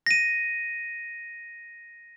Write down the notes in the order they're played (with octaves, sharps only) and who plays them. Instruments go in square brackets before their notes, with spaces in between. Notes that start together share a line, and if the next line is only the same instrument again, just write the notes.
[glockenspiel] A#6 D#7